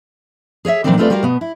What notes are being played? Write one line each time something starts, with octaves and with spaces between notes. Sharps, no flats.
G#4 C#5 D#5 E5
A#2 D#3 E3 F#3 C4 D4
G#3 A3 C4 F4 B4 D5
G3 F4 F#4 A#4 E5 F5
B2 B3
E4